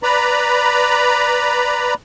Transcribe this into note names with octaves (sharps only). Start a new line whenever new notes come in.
B4 D5 A#5 B5